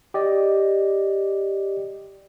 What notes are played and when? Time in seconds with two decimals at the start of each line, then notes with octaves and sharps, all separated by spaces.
0.14 G4 D5 D#5